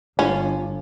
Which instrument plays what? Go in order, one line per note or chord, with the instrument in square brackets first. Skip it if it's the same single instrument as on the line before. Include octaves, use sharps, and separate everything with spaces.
[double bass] G1 [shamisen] C#4 [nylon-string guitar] D4 F4